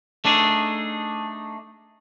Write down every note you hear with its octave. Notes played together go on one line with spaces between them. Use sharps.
A3 D4 D#4 G#4